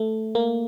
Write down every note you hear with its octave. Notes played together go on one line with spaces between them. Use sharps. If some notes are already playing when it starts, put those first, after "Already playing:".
Already playing: A3
A#3